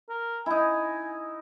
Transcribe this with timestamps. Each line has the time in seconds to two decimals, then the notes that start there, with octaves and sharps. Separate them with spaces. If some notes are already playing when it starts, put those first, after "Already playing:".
0.09 A#4
0.46 D#4 E4 G#5